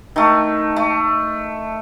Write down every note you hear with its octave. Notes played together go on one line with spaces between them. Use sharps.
D#3 A3
A3